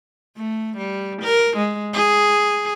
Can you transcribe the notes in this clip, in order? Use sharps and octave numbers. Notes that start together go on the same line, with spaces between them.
A3
G3
A#4
G#3
G#4